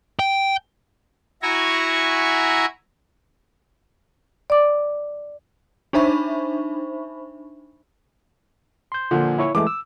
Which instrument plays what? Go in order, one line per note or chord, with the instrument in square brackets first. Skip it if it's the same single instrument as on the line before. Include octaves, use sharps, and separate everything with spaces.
[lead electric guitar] G5
[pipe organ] E4 F#4 E5 G#5 A#5 C#6
[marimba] D5 D6
[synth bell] D4 D#4 C5 E5 B5 C#6
[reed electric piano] C6 G6
[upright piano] A#2 D3 F3
[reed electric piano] E4 C#5 C#6
[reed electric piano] E3 G#3 A3 [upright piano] D6
[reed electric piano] E6